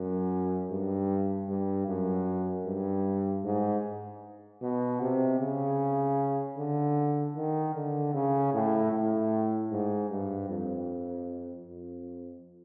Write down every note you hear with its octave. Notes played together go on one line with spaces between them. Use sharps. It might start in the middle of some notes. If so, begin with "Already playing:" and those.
Already playing: F#2
G2
G2
F#2
G2
G#2
B2
C3
C#3
D3
D#3
D3
C#3
A2
A2
G#2
G2
F2
F2